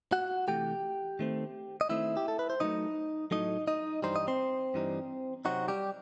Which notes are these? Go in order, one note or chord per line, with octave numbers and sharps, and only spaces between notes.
F#4 F#5
C3 E3 A3 G4 G5
D#3 A3 C4
D#5
D#3 A3 C4 E4 E5
G4
A4
B4
C5
A2 F#3 A3 D#4 D#5
A2 F#3 A3 D#4 D#5
D#4 D#5
G2 E3 G3 D#4 C5
D#5
C4 C5
G2 E3 G3 D#4
C3 F#3 C4 D#4 F#4
G3 G4